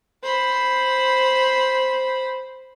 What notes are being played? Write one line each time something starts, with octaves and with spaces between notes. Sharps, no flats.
C5 B5